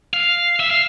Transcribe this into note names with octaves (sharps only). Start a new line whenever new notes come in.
F5
E5
F5